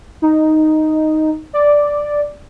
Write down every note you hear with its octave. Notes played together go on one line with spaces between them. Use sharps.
D#4
D5